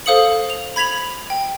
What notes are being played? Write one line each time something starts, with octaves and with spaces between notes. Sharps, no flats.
A4 C5 F5 D#6 C#7 F#7
F7
B5 G#6 B6 F7 F#7
G5